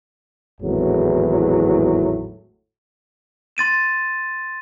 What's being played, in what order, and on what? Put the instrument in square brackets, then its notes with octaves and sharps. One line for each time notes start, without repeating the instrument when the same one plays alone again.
[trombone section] G#1 E2 A2 F#3
[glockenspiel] C6 A6 D#7 E7